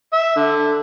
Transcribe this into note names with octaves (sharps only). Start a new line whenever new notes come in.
E5
D3